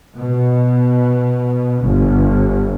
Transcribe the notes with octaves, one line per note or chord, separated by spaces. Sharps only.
B2
G1